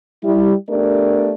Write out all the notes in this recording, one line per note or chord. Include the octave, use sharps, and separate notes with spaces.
G3 E4
A3 B3 D4 G4 A#4 D5